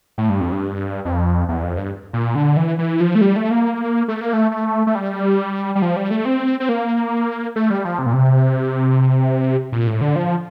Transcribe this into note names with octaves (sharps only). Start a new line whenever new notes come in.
A2
G2
F2
G2
F2
E2
F2
G2
A#2
D3
E3
E3
F3
A3
G3
A3
A#3
A3
A#3
A3
A3
A3
G3
G3
F3
G3
A3
C4
C4
A#3
A3
G3
F3
C3
A#2
C3
A#2
A2
D3
F3